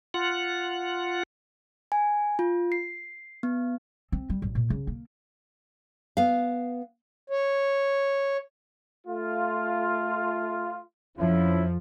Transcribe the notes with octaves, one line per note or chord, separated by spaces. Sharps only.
F4 F#5
G#5
F4
C7
B3
C4
G3
A1
A#2
C#3
A#3
B3 F5
C#5
A3 F4
F2 F3 C#4 E4